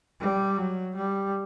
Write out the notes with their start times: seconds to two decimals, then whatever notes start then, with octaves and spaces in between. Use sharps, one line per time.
0.20 G3
0.57 F#3
0.95 G3